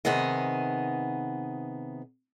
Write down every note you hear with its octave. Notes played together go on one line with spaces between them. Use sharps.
C3 D#3 B3 G#4 D#5